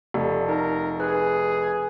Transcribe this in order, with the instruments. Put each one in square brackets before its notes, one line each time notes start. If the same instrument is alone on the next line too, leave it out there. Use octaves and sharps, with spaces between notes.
[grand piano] F1 [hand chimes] A4 D5 A5
[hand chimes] D#4 [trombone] A#4
[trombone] G#4 [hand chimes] B4 F#6